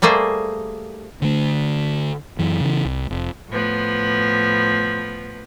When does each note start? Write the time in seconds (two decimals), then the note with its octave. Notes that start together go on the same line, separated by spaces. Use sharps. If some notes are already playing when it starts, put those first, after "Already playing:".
0.02 G3 A3 A#3 G#4 C5
1.22 D3 A3
2.39 F#2 E3
2.61 C#3 E3
2.85 C2
3.10 F1
3.48 A2 F3 B3